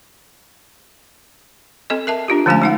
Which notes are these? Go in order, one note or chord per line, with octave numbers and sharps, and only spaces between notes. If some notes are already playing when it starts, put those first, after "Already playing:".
C4 A4 D#5
A#4 E5 A5
D4 F4 G4
D3 F3 G#3 A3 C#4 G#5
G#3 D#4 F#5